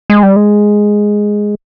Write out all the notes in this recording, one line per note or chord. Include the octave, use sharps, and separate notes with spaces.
G#3
G3
G#3